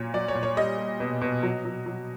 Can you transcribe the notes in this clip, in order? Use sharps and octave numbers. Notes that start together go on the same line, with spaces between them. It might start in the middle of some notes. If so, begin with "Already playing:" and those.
Already playing: A#2 F#3 C#5
F#3 D5
C#5
A#2
C#5
G3 D#5
G3
B2
B2
F#3
F#3
F#3